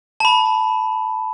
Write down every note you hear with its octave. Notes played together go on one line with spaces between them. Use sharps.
A5 B5